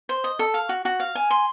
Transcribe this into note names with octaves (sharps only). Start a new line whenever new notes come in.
C5
D#5
A4
F5
F#4
F#4
F5
G#5
C6